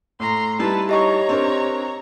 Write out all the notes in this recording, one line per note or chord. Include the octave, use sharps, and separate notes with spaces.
A2 A#5 C6
G3 D#4 E4 B4 A5
G4 C#5 D#5 A#5 C#6
C4 D4 A#4